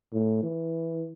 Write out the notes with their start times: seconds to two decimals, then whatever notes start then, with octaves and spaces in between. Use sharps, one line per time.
0.14 A2
0.43 E3